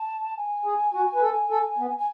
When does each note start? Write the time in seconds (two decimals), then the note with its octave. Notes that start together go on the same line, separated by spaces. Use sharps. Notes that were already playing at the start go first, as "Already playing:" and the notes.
Already playing: A5
0.37 G#5
0.65 G#4
0.94 F#4
1.15 B4
1.22 A4
1.50 A4
1.78 B3
1.98 G#5